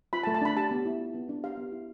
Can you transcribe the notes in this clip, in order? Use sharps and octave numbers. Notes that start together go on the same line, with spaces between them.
F4 B5
A5
A3
A5
D4 B5
G4 A5
B3
E4
F4
B3
D4
G4 F5
B3
E4